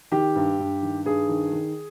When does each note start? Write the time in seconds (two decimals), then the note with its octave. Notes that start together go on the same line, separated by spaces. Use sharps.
0.12 D#3 G4
0.35 G2
0.59 G2
0.82 D#3
1.05 G2 G#4
1.29 D#3
1.52 D#3